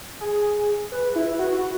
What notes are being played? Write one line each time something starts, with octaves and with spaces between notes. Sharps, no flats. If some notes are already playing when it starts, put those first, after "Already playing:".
G#4
B4
E4
F#4
F#4